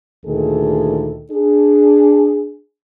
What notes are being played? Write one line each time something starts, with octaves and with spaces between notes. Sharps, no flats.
D2 A#2 D#3 G#4 A4
D4 G#4